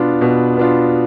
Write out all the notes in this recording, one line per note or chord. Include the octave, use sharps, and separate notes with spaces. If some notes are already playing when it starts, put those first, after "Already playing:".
Already playing: B2 B3 D4 F4
B2
B3 D4 F4